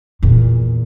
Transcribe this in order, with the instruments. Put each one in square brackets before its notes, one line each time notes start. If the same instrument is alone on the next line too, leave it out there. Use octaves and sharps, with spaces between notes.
[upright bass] E2 A#2